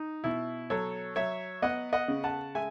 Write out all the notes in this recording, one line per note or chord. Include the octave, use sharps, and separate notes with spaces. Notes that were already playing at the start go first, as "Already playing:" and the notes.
Already playing: D#4
B2 E4
F#3 A4 C#5
F#3 C#5 E5
B3 D#5 F#5
D#5 F#5
C#3
F#5 A5
G#3 E5 G#5